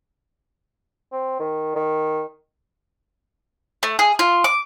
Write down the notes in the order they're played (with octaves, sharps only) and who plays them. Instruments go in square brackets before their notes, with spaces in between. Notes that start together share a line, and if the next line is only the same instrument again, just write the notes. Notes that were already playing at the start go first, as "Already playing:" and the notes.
[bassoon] C4
D#3
D#3
[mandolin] A3
G#4
F4
D6